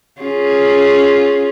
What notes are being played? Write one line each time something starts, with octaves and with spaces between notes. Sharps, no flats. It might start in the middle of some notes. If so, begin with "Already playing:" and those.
C#4 F4 G#4